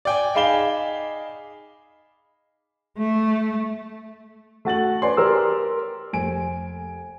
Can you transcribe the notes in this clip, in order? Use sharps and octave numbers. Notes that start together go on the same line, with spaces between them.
D5 G5 G#5
D#4 G#4 F5 B5 E7 G7
A3
A3 F#4 A6 F#7
B4 C#5 D5 G#5 C6
G4 A#4 C6 E6
F1 G#5 D7